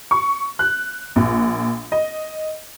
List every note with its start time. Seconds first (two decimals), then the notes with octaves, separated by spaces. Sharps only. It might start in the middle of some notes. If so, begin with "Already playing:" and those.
0.11 C#6
0.59 F#6
1.16 A#1
1.92 D#5